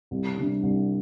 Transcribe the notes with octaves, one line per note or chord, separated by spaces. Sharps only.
C2
C3 G3 D4
C2